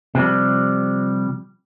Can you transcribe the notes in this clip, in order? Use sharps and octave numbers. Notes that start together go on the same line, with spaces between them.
C3 F3 G3